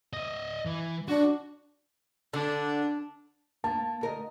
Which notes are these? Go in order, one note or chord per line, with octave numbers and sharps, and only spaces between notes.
D#5 E5
E3
D4 F#4
D3 D4
A#3 A5
D2 A#4 D#5